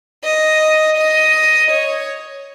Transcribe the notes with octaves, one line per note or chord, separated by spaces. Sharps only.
D#5
D#5
C#5